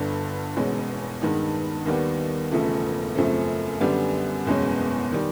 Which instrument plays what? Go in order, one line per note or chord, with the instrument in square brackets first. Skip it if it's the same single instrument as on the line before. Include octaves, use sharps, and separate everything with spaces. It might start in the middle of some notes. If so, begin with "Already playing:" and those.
Already playing: [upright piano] G1 G2 D3
E1 E2 B2 G#3 C#4
G2 D#3 G#3 B3 D#4
D#2 D#3 G3 B3
E1 E2 C#3 F3 A3
F#2 C#3 F3 A3 C4
F#2 D3 G3 B3
F#1 E2 B2 G#3 C#4
D#3 G3